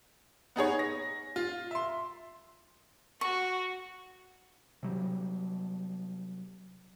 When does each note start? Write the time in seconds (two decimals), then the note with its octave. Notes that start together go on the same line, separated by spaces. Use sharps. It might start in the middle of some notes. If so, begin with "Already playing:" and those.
0.56 B3 D#4 G#4 C#5
0.79 A#6
1.36 F4
1.71 E5 C6
3.21 F#4 C#6
4.83 C3 F#3 G3